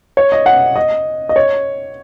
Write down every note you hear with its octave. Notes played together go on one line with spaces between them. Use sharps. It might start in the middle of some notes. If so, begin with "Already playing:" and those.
C#5
D#5
F#5
D#5
D#5
C#5